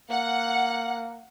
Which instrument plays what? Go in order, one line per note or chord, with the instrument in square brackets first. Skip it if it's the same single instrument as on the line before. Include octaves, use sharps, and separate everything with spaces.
[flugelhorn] A#3 [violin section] F#5